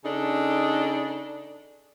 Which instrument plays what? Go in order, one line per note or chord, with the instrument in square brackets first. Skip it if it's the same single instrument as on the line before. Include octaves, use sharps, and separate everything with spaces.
[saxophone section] C#3 D4 D#4 A4